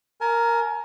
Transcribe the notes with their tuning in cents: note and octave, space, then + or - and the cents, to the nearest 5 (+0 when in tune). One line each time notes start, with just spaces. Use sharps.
A#4 +0 G#5 +35